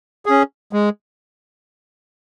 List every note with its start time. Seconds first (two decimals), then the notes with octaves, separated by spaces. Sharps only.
0.26 C#4 G#4
0.73 G#3